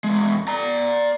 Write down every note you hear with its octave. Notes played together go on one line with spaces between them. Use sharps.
E2 G#3
D5 A#5